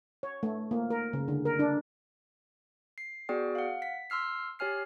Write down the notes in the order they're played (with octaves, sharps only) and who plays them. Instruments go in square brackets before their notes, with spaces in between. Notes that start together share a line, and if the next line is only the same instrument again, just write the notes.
[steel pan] C#5
A3
A#3
A#4
C#3
D3
A#4
D4
[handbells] C7
B3 F#4 G#4 D5 G5
F5 F#5
B6
C6 E6 F6 C7
G4 C#5 G#5 F6 C7